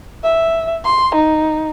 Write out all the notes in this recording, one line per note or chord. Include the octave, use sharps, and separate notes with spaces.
E5
C6
D#4